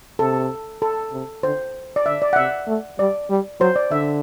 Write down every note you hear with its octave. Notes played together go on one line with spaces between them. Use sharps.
C3 A4
A4
C3
D3 C5
D5
D3 E5
D5
F#5
C3 E5
A3
G3 D5
G3
F#3 C5
D5
D3 E5